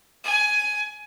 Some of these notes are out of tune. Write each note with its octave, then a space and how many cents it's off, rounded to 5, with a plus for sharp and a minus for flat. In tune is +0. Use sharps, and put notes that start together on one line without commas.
G#5 +15